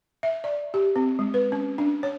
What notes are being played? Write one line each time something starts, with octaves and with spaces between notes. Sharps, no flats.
E5
D5
G4
C4
G#3
B4
C#4
D4
C#5